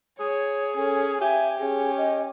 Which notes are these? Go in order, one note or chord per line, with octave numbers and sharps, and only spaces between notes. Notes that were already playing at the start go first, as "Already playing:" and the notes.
G#4 C#5
C#4 A4
G4 E5 G#5
C#4 G#4
D#5